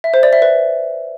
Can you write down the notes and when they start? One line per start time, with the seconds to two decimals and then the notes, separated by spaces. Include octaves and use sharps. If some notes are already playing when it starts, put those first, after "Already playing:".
0.04 E5
0.14 C5
0.23 D5
0.33 E5
0.42 B4